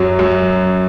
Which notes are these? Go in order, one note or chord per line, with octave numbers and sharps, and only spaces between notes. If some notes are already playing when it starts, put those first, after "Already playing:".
Already playing: F#2 F#3
F#2